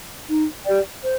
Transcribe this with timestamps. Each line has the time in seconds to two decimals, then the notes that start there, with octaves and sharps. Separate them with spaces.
0.28 D#4
0.65 G4 D5 G5
1.03 C5